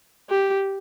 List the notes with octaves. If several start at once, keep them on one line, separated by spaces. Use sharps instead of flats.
G4